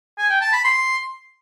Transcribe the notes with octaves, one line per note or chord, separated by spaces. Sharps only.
G#5
G5
A5
B5
C6